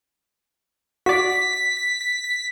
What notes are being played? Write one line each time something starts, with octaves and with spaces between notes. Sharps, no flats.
F#4 D5 B6